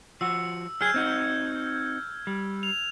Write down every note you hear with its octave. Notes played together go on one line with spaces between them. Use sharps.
F3 F#4 E6
F#3 G#4 F6 G6 G#6
C4 D#4 F#4
G3
F7